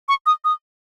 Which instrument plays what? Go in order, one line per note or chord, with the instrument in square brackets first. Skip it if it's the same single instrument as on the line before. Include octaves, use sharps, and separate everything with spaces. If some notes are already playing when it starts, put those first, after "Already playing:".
[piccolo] C#6
D#6
D#6